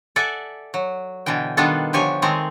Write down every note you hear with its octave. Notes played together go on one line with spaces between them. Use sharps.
A4 D5 E5 F#5 G#5
F#3
B2 D3 E3 G5
D#3 G3 B3 D4 F4 A4
D3 F3 G4 C#5 G#5
D#3 G#3 A3 C4 A#5